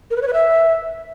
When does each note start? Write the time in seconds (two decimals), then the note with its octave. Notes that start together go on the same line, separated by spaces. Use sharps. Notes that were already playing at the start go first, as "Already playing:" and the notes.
0.11 A#4
0.16 B4
0.22 C#5
0.28 B4
0.33 E5